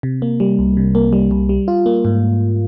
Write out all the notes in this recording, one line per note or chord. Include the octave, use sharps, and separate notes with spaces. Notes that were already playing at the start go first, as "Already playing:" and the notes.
C3
A#3
G3
C2
C3
A#3
G3
C2
G3
F4
A#3
G#2